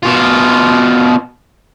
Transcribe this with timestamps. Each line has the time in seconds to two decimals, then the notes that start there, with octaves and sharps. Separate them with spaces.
0.03 B2 F4